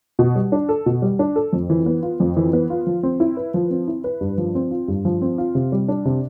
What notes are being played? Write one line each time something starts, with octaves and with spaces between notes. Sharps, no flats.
B2
G3
D4
A4
B2
G3
D4
A4
F2
E3
B3
F4
F2
E3
B3
F4
F3
C4
E4
B4
F3
C4
E4
B4
G2
F3
C4
F4
G2
F3
C4
F4
C3
G3
D4
C3